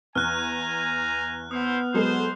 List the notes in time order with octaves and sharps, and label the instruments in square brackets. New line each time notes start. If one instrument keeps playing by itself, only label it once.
[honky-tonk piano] E2 [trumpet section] G#5 A#5 [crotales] F6 F#6
[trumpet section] A3 E4 C5 [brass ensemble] B3 [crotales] D#6
[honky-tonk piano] F#3 G#3 A4 [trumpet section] C5